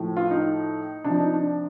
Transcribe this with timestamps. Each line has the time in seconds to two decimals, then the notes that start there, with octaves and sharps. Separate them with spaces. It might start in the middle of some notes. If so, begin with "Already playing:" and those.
Already playing: A2 F3
0.17 F4
0.31 D#4
1.04 C3 F3 D4
1.19 D#4
1.34 D4